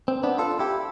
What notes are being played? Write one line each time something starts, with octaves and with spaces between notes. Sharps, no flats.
C4
B3 D4
F4 A4
E4 G4